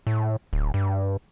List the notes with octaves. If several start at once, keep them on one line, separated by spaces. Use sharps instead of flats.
A2
D1
G2